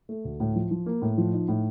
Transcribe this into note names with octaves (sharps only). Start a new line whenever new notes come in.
A3
D2
A2
F3
F3
A#3
A2
F3
D#4
A2